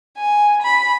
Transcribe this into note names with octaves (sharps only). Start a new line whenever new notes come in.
G#5
B5